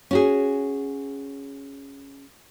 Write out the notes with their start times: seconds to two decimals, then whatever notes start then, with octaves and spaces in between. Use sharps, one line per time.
0.11 C#4 F#4 G#4